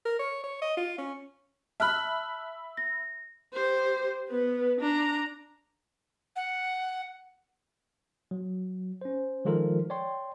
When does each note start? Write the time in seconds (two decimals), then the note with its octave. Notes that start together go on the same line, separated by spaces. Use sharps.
0.05 A#4
0.19 C#5
0.43 C#5
0.62 D#5
0.77 F4
0.98 C#4
1.80 E5 A5 B5 F6 F#6
2.77 A#6
3.54 G4 C5
4.29 B3 B4
4.81 D4 A#5
6.36 F#5
8.31 F#3
9.01 C#4 C5
9.45 D#3 F3 G#3 F4 A4 A#4
9.90 C#5 D5 G5 C6